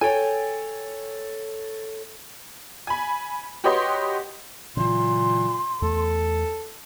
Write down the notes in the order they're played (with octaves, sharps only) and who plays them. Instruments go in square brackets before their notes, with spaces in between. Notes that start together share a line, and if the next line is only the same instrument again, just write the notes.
[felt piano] A4 C#5 [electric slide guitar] G5 G#5
[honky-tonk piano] G#5 B5
F#4 G4 B4 C#5 D#5 C6
[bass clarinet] A#2 [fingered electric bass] C#3 E3 F#3 [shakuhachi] C6
[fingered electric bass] E2 A3 [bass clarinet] A4